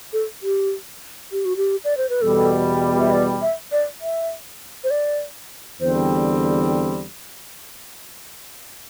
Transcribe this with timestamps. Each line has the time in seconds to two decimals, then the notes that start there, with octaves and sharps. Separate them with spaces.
0.13 A4
0.43 G4
1.32 G4
1.45 F#4
1.57 G4
1.84 D5
1.97 C5
2.09 B4
2.22 E2 B2 G3 A4
2.99 E5
3.11 D5
3.42 E5
3.72 D5
4.02 E5
4.84 C5
4.91 D5
5.80 E2 D3 G3 C4 C5